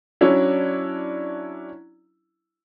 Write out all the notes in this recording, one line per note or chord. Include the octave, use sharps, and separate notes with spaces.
F#3 C#4 D4 E4